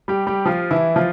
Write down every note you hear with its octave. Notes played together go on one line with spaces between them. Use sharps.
G3 G4
G3 G4
F3 F4
E3 E4
F3 F4